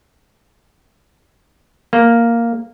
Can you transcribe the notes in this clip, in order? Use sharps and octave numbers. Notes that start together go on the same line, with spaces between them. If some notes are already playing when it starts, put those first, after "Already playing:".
A#3